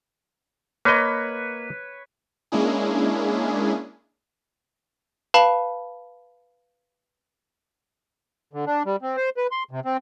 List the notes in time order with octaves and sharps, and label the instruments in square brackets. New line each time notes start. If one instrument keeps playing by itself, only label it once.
[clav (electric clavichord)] A#3 D#5 [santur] B4 C#5
[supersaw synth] G#3 A#3 C#4 D4 E4 G#4
[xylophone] B4 F5 A5 B5
[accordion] D3
D4
G3
C4
C5
B4
C6
C3
C4